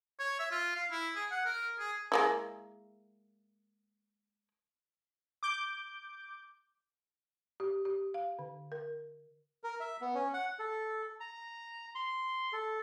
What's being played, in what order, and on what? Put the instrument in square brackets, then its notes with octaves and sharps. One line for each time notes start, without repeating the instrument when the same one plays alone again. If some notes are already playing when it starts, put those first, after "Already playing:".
[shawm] C#5
E5
F4
F5
E4
G#4
F#5
A#4
G#4
[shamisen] G#3 A#3 E4
[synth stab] D6 G6
[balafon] G4
G4
F5
D3
A#4
[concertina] A#4
E5
B3
C#4
F#5
A4
A#5
C6
A4